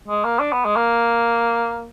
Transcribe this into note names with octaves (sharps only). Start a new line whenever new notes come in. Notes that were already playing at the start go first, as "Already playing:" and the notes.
G#3
A#3
D4
B3
G#3
A#3